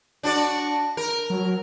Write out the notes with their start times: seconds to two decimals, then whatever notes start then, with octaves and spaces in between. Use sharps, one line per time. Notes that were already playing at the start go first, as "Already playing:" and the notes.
0.23 D4 F#4 D5
0.97 A#4
1.30 F#3